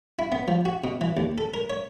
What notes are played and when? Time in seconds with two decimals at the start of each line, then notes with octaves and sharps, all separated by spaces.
0.19 E4
0.32 B3
0.48 F3
0.65 F#4
0.84 B2
1.01 E3
1.17 D#2
1.38 A4
1.54 A#4
1.70 C#5